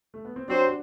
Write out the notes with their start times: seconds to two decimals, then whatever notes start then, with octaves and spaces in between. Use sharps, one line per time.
0.14 A3
0.25 B3
0.36 C4
0.48 F#3 C4 D4 F#4 C5
0.67 F#4